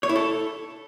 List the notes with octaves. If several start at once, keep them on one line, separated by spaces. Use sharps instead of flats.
C#5
E4
A4